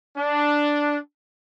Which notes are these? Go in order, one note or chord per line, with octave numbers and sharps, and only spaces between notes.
D4